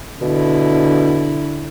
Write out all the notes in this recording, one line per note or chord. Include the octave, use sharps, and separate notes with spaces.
B2 D3 E4